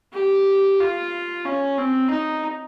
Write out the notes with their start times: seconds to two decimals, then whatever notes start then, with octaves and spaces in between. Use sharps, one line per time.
0.13 G4
0.80 F4
1.45 C#4
1.78 C4
2.10 D#4